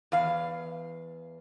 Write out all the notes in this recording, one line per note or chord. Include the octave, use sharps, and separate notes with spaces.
E2 F5